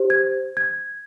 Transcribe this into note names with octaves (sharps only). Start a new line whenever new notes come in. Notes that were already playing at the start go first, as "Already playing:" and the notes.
Already playing: G4 C5
G#6
G#6